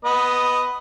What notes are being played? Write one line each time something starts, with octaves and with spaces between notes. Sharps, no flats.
B3 B4 D#5